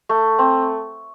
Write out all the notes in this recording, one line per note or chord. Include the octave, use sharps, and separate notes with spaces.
A3
C4